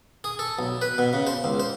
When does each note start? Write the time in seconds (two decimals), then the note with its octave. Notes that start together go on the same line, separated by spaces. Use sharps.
0.24 G#4
0.39 A4
0.59 B1
0.81 B4
0.98 B2
1.13 C#3
1.27 C5
1.44 C#2
1.60 C5